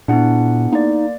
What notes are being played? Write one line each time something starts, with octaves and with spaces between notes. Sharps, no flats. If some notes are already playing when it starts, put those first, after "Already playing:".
A#2 B3 D4 E4 G#4 F#5
A#3 D#4 D5